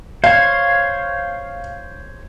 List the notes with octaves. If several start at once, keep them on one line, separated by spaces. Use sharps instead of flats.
C5 C#5 F5